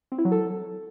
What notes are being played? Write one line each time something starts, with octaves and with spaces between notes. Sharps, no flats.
C4
E4
F#3
A4